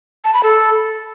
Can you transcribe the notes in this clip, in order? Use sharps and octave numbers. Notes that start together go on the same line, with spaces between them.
A5
B5
A4